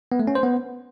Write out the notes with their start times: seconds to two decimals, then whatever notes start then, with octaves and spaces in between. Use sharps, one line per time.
0.12 B3
0.20 A3
0.27 C#4
0.35 C5
0.43 B3